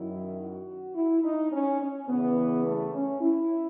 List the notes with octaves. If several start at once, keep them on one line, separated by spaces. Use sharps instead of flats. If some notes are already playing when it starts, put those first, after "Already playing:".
Already playing: F#2 D#3 F#3 E4
F#4
E4
D#4
C#4
C#4
E2 C#3 E3 B3
A3
C#4
E4